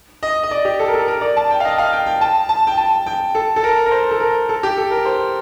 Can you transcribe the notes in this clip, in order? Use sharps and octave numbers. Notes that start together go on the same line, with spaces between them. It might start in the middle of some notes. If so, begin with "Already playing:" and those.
D#5
D#5
D5
G4
A4
A#4
A4
A#4
D5
A5
G5
F5
D#5
F5
G5
G5
A5
A5
G5
A5
G5
A4
A4
A#4
A#4
C5
A4
A#4
A4
G4
A4
A#4
C5